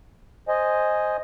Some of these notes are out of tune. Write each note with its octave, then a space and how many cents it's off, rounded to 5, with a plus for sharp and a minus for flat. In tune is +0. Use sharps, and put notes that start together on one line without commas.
C5 +0 D#5 +0 G#5 +0